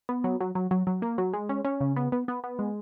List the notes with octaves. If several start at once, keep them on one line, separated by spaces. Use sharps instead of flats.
B3
F#3
F#3
F#3
F#3
F#3
A#3
F#3
G#3
C#4
C#4
C#3
B3
B3
B3
B3
G#3